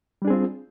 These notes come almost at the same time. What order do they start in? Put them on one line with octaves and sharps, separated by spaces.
G3 D4 G#4 C4 F4